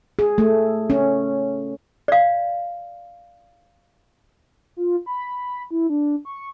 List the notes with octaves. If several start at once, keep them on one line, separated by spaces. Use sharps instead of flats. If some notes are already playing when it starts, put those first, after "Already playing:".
G#4
A3
C#4
D5 F5
F4
B5
E4
D4
C#6